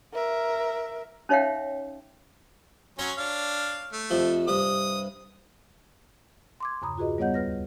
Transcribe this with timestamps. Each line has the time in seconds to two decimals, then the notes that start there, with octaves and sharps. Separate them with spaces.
0.13 A#4 E5
1.29 C#4 D#4 C#5 E5 F5 G5
2.99 F#3 C#4 C#5 A#5 C6
3.18 D4 F5
3.93 A3
4.10 F2 C3 F3
4.48 G2 C3 D#6
6.60 C6 D6 G#6
6.82 E2 G2 C#3 A#5 B5 D#6
6.98 F4 F#4 G#4 B4 D#5
7.18 G3 B3 C#5 D#5 F#5 G6
7.34 D2 B4 F6 A#6